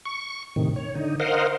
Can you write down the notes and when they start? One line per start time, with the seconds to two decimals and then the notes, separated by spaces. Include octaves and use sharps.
0.05 C#6
0.56 A2 C3 D#3
0.76 C#5
0.95 D3 D#4
1.20 A#4 C5 D#5 F5 F#5